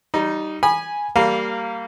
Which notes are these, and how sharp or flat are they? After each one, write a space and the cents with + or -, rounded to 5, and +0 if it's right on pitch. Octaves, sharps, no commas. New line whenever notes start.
G3 -20 D#4 +0
G#5 -5 B5 -15 D#6 -45
G3 -10 A#3 -20 F5 +0